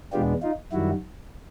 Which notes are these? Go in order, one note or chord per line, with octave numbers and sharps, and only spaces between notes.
E2 B2 G#3 B3 D4 F4 G4
D#4 F4
F#2 D#3 G3 E4 F#4